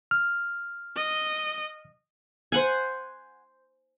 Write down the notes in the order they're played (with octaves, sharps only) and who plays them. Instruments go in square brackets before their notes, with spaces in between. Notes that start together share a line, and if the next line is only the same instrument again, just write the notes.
[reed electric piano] F6
[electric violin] D#5
[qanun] C5 F#5 G#5